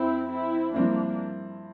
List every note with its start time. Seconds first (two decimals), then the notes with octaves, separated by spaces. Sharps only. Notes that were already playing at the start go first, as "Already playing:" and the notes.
Already playing: F2 C4 E4
0.30 C4 E4
0.74 G2 F3 A#3 C4 D4 E4